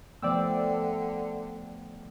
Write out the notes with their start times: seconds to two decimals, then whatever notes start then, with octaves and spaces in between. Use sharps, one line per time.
0.23 D3 F3 A3 B3 D5 G5 E6